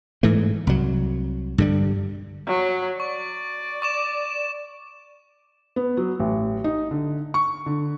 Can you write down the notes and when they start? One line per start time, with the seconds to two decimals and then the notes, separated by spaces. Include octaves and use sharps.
0.23 G#2 E3 A3
0.67 C2 F#3
1.58 G2 D3 G3
2.47 F#3
3.00 D5 C#6
3.82 C#6 D6 E7
5.76 B3
5.97 F#3
6.19 A1
6.64 D#4
6.91 D3
7.34 C#6
7.66 D3